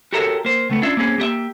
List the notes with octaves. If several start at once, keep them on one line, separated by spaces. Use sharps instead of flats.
F#4 G4 A4 A#4 C#5 E5
A#3 C5
C#2 A3 B3
C#4 D4 F4 E5
A#3 C4 C#4 G#4
A#3 G4 D#5 E5